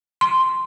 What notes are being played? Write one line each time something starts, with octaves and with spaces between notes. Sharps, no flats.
C6